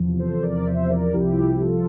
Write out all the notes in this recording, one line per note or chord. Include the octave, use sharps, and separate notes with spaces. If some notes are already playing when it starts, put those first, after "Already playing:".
Already playing: E2 C3 F3
A4 C5
A#4 D5
C5 E5
A#4 D5
C2 C3 F3 E4 G4
F4 A4